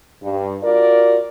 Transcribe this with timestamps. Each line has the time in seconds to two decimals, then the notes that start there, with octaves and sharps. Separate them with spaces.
0.22 G2
0.63 F4 F#4 A#4 D5